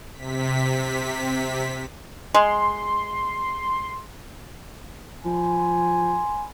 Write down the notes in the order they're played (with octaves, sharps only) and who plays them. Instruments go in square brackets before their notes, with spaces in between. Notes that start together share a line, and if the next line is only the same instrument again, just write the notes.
[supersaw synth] C3 B6
[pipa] G#3 [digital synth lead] C6
[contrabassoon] F3 [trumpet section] G#5 B5 C6